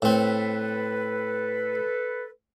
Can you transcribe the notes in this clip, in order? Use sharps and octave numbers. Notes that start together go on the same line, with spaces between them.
A2 C4 A4 B4